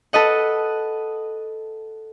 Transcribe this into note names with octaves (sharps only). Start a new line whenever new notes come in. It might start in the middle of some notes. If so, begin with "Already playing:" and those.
A4 B4 D#5 F#5